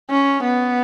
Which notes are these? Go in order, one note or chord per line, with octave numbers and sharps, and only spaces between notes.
C#4
B3